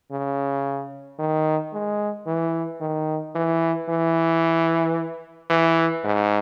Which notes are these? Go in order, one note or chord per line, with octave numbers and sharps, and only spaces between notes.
C#3
D#3
G#3
E3
D#3
E3
E3
E3
G#2